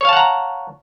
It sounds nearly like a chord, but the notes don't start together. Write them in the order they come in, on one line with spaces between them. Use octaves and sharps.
C#5 F5 A5 F#5 A#5